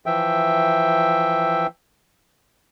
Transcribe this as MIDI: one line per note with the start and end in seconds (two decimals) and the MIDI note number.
0.06 1.67 52
0.06 1.67 53
0.06 1.67 76
0.06 1.67 79